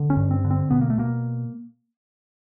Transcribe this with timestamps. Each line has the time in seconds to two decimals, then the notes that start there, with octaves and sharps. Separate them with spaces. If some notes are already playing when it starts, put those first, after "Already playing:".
Already playing: D3
0.10 C#4
0.17 G2
0.31 C4
0.45 D3
0.51 C4
0.71 B2 B3
0.81 A#3
0.90 A3
0.98 B2 A#3